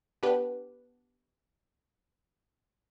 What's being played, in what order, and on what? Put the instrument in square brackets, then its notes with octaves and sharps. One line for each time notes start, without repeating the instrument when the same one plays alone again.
[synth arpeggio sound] B3 D4 G4 B4